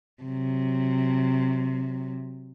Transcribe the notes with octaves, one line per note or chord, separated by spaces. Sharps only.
C3 F#3